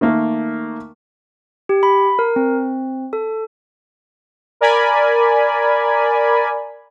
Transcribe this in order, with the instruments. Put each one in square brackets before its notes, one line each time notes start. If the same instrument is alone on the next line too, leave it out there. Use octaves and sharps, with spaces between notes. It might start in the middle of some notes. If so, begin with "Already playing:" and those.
[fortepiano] D#3 A3 A#3
[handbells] G4
B5
A#4
C4
A4
[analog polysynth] A#4 D5 G#5 B5